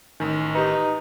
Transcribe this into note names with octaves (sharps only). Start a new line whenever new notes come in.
A1 D#3 G#5
D#4 G4 B4